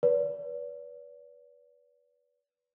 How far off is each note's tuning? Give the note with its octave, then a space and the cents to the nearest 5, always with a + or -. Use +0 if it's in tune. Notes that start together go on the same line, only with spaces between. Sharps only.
B4 -10 D5 -35